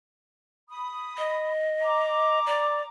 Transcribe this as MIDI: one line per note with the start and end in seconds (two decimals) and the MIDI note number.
0.69 1.49 83
0.69 1.49 87
1.18 2.39 75
1.82 2.88 82
1.82 2.88 86
2.46 2.82 74